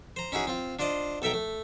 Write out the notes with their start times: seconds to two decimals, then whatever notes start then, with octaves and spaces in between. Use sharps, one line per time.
0.16 C5 A#5
0.32 C#4 D#4 E4 F#4 G#4
0.47 C4 F4
0.79 D4 F4 C5 D5 D#5
1.22 B1 A4 E5 G5 A#5
1.34 A3